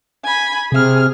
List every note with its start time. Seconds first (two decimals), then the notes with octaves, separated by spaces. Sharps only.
0.24 G#5 B5
0.72 C3 G#4 F6